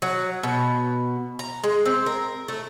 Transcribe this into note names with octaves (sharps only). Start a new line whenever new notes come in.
F#3
B2
A#5
G#3
C4
A#4
A3